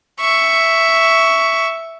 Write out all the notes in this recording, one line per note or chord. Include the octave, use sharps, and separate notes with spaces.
E5 C#6